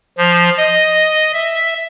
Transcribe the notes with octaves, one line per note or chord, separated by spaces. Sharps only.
F3
D#5
E5